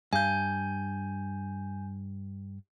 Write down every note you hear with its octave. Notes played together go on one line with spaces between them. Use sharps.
G2 G#5 G6